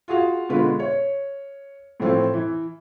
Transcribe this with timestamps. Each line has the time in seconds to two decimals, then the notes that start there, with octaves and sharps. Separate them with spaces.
0.08 F4 F#4 G#4 F5
0.49 B2 D3 G#3 F4 B4
0.79 C#5
2.00 A2 E3 F3 A3 C4 F4
2.34 E3